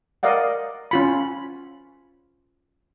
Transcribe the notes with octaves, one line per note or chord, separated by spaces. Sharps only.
A#4 D5 D#5 F5 F#5
C#4 F4 B5